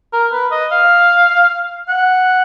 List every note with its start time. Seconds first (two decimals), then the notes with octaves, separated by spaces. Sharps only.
0.13 A#4
0.32 B4
0.52 D#5
0.72 F5
1.89 F#5